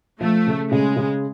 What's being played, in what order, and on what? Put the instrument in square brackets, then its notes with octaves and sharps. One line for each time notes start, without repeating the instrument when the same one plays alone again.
[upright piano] F3 [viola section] A3
[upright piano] C#3
[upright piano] C#3 [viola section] G#3
[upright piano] C#3